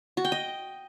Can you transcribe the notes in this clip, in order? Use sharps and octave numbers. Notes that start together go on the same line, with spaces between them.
F#4
G5
D#5